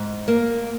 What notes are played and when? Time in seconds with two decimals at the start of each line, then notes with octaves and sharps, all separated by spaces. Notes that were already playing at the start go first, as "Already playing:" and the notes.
Already playing: G#2
0.28 A#3